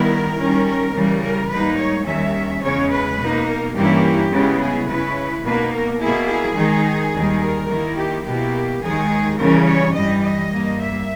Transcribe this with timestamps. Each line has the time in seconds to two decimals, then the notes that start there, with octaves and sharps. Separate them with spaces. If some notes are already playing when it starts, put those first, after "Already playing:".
Already playing: D#3 G3 B3 E4 A#4
0.37 D#3 G3 C#4
0.65 A#4
0.93 C#3 E3 G3
1.21 A#4
1.49 G#2 G3 A#3 D#4 B4
1.78 C#5
2.06 D#2 D#3 G3 C#4 E5
2.62 E2 C#3 G#3 C#4 C#5
2.90 B4
3.18 B2 A#3 D#4
3.46 A#4
3.74 G2 E3 A#3 C#4 E4 G4
4.30 C#3 G#3 B3 E4
4.59 G#4
4.87 C#3 G#3 C#4 E4 B4
5.43 B2 A#3 D#4 B4
5.72 A#4
6.00 B2 A#3 E4 G#4
6.28 G#4
6.56 D#3 G#3 D#4
7.12 D#2 D#3 G3
7.40 A#4
7.69 D#3 A#3 E4
7.96 G4
8.25 B2 A#3 E4 G4
8.81 D#2 D#3 G#3 D#4 G#4
9.37 C#3 E3 G3 C#4 A#4
9.65 C#5
9.93 G2 E3 G3 D#5
10.22 D#5
10.50 G2 G3 A#3
10.78 E5